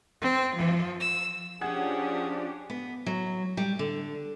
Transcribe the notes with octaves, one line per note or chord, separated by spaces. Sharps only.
C4
F3
E6
F3 C#4 D4 G4 G#4 F#5 G#6
B3
F#3
G3
D3